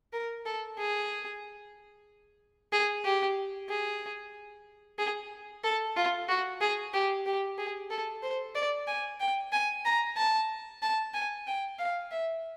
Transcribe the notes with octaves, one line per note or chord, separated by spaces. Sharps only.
A#4
A4
G#4
G#4
G4
G#4
G#4
A4
F4
F#4
G#4
G4
G4
G#4
A4
C5
D5
G#5
G5
G#5
A#5
A5
A5
G#5
G5
F5
E5